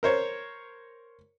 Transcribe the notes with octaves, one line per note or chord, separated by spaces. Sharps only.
A#4 C5 C#5